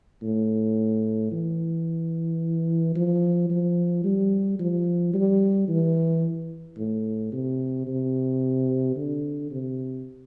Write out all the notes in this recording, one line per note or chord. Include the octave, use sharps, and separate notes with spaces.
A2
E3
F3
F3
G3
F3
G3
E3
A2
C3
C3
D3
C3